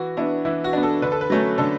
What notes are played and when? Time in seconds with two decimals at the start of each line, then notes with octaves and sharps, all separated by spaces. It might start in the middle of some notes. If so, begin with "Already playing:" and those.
Already playing: E3 F#4
0.17 B3 D4 E4
0.45 E3 E4
0.64 F#4
0.73 B3 D4
0.83 A4
1.02 D3 B4
1.12 A4
1.21 B4
1.30 F#3 A3 C#4
1.58 D3 A4